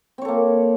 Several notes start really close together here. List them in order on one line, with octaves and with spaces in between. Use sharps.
C4 C#5 A4 A#3